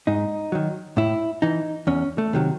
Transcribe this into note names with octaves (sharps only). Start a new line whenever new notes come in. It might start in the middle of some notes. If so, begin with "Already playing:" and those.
G#2 D#4
D#3 F#3
A2 E4
E3 D#4
E2 C#4
A3
C3 D#3 F#3